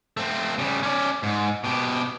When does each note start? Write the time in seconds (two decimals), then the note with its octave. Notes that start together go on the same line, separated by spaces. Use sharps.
0.17 A3 C4
0.58 C#3 G3
0.83 C#4 D5
1.23 G#2
1.64 B2 G4